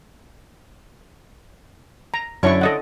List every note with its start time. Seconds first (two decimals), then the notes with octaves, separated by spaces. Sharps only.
2.14 A#5
2.43 F#2 D3 C#4 D4 E4 C#5 C#6
2.61 A4 D#5 F#5